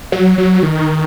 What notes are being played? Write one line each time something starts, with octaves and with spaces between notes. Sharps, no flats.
F#3
F#3
D#3